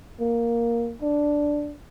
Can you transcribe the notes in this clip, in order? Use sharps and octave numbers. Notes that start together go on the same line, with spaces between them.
A#3
D4